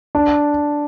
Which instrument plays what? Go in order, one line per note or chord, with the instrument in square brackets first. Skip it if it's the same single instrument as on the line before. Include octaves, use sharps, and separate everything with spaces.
[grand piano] D4